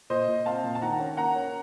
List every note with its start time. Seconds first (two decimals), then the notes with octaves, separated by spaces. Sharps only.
0.10 A#2 C5 D#5
0.28 A#2
0.46 C4 F5 A5
0.64 A#2
0.75 A5
0.82 D#3 F#5 A#5
1.00 C#4
1.17 A#3 F#5 A#5
1.36 C#4